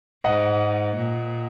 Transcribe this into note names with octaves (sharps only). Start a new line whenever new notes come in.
G#2 D#5 F#5
A#2